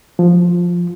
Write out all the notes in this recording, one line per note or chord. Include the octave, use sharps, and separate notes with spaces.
F3